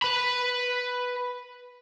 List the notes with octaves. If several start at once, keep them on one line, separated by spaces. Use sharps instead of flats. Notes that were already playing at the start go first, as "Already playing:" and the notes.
B4 B5